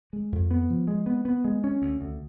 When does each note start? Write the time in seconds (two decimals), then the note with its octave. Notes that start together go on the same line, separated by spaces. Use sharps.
0.13 G#3
0.32 F2
0.51 B3
0.70 F3
0.88 G#3
1.06 B3
1.25 B3
1.44 G#3
1.64 C#4
1.82 D2
2.01 D2